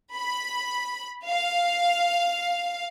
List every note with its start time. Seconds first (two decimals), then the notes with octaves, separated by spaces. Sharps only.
0.15 B5
1.27 F5